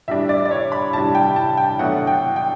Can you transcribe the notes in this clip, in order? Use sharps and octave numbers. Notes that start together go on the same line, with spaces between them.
A2 G3 D4 E5
D5
D5
C#5
B5
A2 G3 D4 A5
G5
A5
G5
B2 F#3 A3 D4 F#5
G5
G5